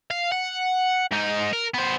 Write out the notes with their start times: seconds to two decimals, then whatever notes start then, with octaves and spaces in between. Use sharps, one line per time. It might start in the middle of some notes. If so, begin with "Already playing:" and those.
0.11 F5
0.32 F#5
1.11 G#2 D#4
1.53 A#4
1.74 B3 C5